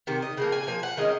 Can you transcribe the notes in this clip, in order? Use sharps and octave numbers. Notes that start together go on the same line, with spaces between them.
C3 D#3
D#5
C#3 F3 A#3
G#5
F3 A#3 G#5
F#5
D#3 G#3 C#4 D#5